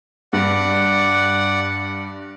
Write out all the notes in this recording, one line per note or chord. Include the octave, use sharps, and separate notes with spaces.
G2 D5 F#5